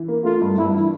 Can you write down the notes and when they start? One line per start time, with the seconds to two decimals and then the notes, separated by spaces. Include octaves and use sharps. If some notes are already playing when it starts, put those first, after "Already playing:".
Already playing: E3
0.08 A#3
0.24 A3 F4
0.42 G2
0.57 G2 E4
0.74 E3